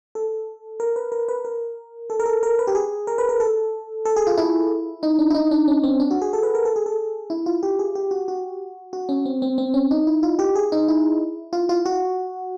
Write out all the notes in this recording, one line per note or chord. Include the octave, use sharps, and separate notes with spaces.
A4
A#4
B4
A#4
B4
A#4
A4
A#4
A4
A#4
B4
G4
G#4
A#4
B4
A#4
A4
A4
G#4
F4
E4
D#4
D4
E4
D#4
D4
C#4
C4
D4
F#4
G#4
A4
B4
A#4
A4
G#4
A4
E4
F4
G4
G#4
G4
F#4
F#4
F#4
C#4
C4
C4
C4
C#4
D#4
E4
F4
G4
G#4
D#4
E4
F4
F4
F#4